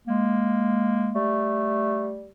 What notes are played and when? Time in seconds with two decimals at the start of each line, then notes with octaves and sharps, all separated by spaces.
0.07 G#3 A#3
1.15 G3 A3